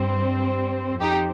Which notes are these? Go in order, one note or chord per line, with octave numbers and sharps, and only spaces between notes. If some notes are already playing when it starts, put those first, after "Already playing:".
Already playing: G2 G3 C4
F2 F3 C4 D#4 G4